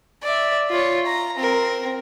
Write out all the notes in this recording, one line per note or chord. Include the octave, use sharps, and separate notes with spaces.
D5 E5
F4 C#5
A#5
C4 A#4